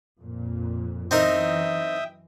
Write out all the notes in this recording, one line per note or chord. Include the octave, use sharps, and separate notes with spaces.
F2 A#2
F#2 E3 C4 D#4 A#4 E5 G5 D#6